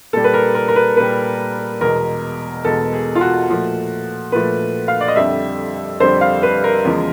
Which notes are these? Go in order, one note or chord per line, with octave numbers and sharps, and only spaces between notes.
A#2 G3 A4
B4
A#4
A#4
A#4
B4
A#2 G3 B4
E2 B2 G#3 A#4
E2 B2 G#3 A4
G#4
F4
F#4
A#2 F3 A3
A#2 F3 A3 B4
F5
D5
D#5
F2 D3 G3 E5
F2 D3 G3 C5
F5
B4
A#4
E2 C#3 F3 G#3